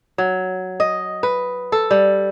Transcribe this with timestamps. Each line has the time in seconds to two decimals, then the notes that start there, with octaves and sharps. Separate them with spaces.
0.18 F#3
0.80 D#5
1.23 B4
1.72 A4
1.91 G3